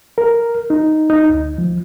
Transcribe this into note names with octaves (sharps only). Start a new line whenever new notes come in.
A#4
D#4
D#4
D2
F3